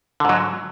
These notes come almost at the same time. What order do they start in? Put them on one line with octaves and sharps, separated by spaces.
D3 G#2 F#3